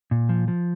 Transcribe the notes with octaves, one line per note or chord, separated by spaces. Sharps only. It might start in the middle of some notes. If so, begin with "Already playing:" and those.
A#2
F3
F3